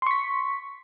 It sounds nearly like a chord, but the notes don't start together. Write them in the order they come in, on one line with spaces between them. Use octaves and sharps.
C6 C#6 B6